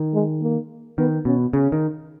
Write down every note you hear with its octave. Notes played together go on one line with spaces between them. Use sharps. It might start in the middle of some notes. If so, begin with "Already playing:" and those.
Already playing: D#3
G#3
A#3
D#3 B3
B2 C#4
C#3 C#4
D#3